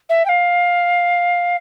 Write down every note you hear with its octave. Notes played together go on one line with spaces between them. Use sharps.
E5
G5
F5